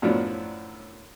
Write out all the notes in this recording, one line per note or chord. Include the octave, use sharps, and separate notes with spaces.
F#2 A2 F3 F#3 B3 D4